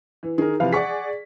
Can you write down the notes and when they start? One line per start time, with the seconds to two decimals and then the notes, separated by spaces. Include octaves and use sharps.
0.23 E3
0.38 D#3 G#4 A#4
0.60 C3 E3 F3 B4 F5
0.73 G#4 D5 F#5 C#6 B6